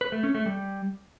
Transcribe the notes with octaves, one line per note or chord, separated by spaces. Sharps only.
B4
A3
C#4
A3
G3